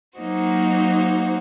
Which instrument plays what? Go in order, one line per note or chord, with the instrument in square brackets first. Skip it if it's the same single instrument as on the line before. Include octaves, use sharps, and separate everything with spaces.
[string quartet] F#3 A#3 D#4 F#4 C5